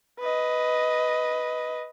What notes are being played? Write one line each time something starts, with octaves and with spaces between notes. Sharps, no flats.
B4 D#5